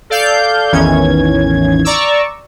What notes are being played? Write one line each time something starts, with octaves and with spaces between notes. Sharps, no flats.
A4 D5 F5 G6
A1 E2 D#3 E3 C#4 G#6
D5 A#5 C#6 D6 E6